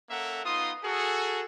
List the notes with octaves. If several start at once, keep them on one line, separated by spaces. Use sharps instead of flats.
A#3 C#4 A4 A#4 E5 F#5
B3 D#4 F4 C6 D#6
F#4 G#4 A4